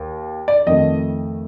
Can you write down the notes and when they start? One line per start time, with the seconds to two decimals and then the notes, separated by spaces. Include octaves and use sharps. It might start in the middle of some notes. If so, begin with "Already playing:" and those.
Already playing: D#2
0.48 D5
0.67 F2 D#3 A3 D#5